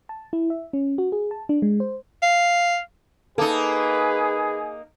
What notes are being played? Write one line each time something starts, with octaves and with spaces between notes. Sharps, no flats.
A5
E4
E5
C#4
F#4
G#4
A5
D4
G#3
C5
F5
A#3 D#4 G#4 A4 B4